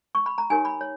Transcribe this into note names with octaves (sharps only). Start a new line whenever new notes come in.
C#6
B5
A#5
D#4 G4 A#4 C#5 G#5
B5
C#5